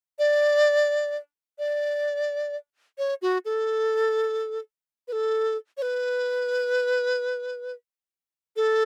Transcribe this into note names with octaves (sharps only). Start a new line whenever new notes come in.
D5
D5
C#5
F#4
A4
B4
A4
C#5
B4
A4